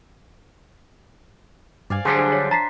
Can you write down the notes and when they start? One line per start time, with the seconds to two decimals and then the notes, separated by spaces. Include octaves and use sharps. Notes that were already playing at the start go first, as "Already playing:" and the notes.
1.90 G2 D5 F5 G#5
2.05 D3 F#3 G3 D4 G#4 C5
2.19 G#4
2.32 C#5
2.51 A5 A#5 B6 C7